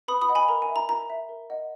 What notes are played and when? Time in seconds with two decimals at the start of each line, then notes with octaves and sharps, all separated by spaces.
0.08 B4 B5 D#6
0.21 B5 D#6
0.29 D#5 F#5
0.35 G#5 B5
0.48 A#4 A#5
0.62 G#5
0.69 E5
0.76 A#5
0.89 A#4 A#5
1.10 E5
1.29 A#4
1.50 D#5 F#5